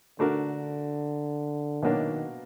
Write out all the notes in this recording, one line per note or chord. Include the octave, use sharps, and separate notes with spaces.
D3 A3 D4 F#4 A#4
B2 D#3 F#3 A#3 D4